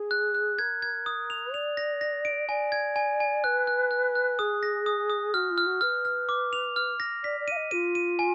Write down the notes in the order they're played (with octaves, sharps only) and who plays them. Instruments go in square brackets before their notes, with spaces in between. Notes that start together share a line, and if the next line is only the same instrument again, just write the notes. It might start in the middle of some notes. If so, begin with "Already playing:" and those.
Already playing: [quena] G#4
[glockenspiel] F#6
F#6
[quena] A#4 [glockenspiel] G#6
[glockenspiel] G#6
D#6
F7
[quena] D5 [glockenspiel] F7
[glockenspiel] A#6
A#6
D7
[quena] D5 [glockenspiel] G#5
[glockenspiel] G#6
G#5
G#5
[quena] B4 [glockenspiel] F#6
[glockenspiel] F#6
F#6
F#6
[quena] G#4 [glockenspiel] D#6
[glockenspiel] A#6
D#6
D#6
[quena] F#4 [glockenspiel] F6
[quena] F4
[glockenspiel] F6
[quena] F#4
[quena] B4 [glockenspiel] F6
[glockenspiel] F6
D6
F7
F6
A#6
[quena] D5 [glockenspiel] B6
[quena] D5
[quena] F5 [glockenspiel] D#7
[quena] D#5
[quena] F4 [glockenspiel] D#7
[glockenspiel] D#7
G#5